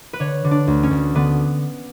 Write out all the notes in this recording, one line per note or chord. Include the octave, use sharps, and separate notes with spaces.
B4
D3 C#5
D3
D4
D2
C#4
D2
D3 B3